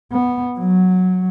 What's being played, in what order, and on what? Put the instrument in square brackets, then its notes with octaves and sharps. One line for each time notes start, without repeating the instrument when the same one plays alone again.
[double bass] B3
F#3